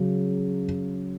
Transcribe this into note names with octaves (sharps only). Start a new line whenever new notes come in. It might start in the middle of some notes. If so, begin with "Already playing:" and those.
Already playing: C#3 F#3